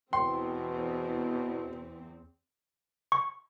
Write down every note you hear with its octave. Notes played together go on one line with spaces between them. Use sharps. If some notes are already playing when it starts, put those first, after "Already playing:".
E2 B2 C4 G5 C6
C#6